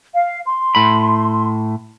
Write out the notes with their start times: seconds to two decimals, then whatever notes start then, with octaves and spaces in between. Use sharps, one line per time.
0.14 F5
0.45 C6
0.75 A2 B5